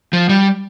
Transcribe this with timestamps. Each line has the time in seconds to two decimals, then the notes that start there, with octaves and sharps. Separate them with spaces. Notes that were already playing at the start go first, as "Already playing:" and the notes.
0.13 F3
0.29 G3